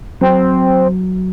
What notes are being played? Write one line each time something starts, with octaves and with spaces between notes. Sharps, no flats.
F#3 C4